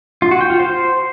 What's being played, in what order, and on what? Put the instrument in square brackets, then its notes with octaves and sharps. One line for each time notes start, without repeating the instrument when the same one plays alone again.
[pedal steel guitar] F4
F#4
G5
F4
C5